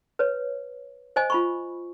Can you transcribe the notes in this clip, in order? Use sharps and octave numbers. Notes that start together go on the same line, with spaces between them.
B4 C#5
C5 D#5 G#5
F4 B5 C#6